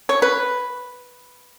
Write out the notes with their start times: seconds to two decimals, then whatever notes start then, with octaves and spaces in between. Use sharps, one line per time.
0.09 C#5
0.22 B4